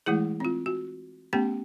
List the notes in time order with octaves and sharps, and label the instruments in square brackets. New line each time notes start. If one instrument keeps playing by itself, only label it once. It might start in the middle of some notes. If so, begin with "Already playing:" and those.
[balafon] E3 G#3 A3 E4 G#4
C4 F4
F#4
A3 B3 C#4 G4 G5